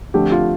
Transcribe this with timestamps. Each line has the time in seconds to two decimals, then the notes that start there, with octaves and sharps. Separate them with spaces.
0.14 F2 D3 A3 G4
0.32 F4